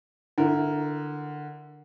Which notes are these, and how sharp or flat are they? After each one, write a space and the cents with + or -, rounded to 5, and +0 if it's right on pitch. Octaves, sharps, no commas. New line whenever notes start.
D3 +15 E4 +25 A#4 +0